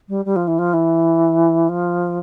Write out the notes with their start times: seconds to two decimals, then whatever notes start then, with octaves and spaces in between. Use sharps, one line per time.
0.08 G3
0.25 G3
0.36 F3
0.47 E3
0.58 F3
0.73 E3
1.69 F3